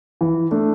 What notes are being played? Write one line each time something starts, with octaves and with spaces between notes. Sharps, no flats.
E3
A3 D4